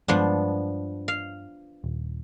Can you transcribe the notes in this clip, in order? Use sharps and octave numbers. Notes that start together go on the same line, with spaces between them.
G2 F3 G#3 B3 D4
F5
D#1